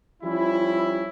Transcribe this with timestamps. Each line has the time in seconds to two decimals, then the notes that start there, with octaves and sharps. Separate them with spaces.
0.23 F3 G3 C#4 E4